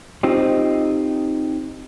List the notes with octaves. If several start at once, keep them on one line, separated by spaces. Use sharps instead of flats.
C4 D#4 F4 G4